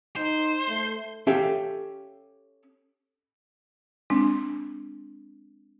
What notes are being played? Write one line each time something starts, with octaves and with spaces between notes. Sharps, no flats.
D#4 C5
A3
C#4 G4 A4 E5 F5
G#3 C4 D4